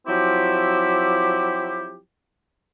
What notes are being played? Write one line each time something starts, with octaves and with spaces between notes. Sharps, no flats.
F3 F#3 C4 E4 G4